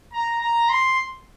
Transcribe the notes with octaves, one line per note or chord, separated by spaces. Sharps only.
A#5
A#5
C6